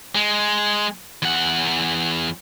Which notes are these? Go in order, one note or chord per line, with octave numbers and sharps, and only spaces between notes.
G#3
E2 F#5